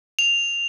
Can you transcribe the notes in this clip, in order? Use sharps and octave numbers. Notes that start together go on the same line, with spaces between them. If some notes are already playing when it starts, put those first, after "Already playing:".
F7